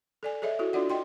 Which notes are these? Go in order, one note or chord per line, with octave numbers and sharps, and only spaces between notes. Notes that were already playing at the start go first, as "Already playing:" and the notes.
A4 D5 G#5
G#4 A4 C#5 D#5 E5
E4 F#4 A4
D4 F4 F#4 D5 F#5
D#5 G5 C6